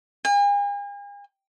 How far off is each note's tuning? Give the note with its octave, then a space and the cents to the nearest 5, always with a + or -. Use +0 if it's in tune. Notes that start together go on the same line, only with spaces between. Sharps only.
G#5 -45